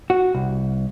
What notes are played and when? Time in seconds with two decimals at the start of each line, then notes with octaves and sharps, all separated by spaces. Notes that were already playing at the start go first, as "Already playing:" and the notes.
0.10 F#4
0.35 C2